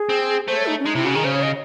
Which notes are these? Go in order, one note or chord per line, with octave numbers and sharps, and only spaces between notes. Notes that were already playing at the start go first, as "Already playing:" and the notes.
Already playing: G#4
C4
A3 C5
C#5
D#4
C#4
G#3 D#4
C3 E4
C#3 F#4
D#3 G#4
C#3 C5
C#5
D#5